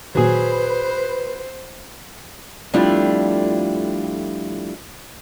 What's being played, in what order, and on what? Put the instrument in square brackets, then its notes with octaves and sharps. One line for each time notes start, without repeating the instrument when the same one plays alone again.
[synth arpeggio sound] A#2 D#3 [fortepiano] F#3 G#4 [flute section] B4 [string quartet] C5
[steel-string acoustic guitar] F2 G3 A3 D4 E4 F4